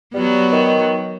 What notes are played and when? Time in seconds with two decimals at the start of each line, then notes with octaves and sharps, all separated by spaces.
0.14 F#3 G3 B3
0.52 D#3